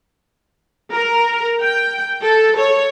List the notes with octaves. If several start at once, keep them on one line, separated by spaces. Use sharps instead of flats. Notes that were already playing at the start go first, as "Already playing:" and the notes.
A#4
G5
A4
C#5